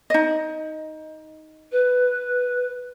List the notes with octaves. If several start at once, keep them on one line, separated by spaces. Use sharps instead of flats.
D#4 D#5
B4